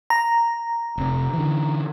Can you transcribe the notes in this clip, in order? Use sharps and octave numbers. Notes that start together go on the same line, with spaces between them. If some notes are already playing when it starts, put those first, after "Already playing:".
A#5
F1 C3
D3 E3